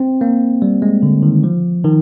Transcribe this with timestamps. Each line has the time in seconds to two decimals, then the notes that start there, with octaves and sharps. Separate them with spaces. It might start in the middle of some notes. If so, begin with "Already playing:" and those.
Already playing: C4
0.21 A#3
0.62 G3
0.82 G#3
1.03 D3
1.23 D#3
1.44 F3
1.84 D#3